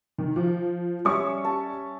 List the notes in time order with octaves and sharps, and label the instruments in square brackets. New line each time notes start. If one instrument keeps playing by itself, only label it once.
[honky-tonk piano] D#3
F3
[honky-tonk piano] G3 C#6 [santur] C#4 E5
[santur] A5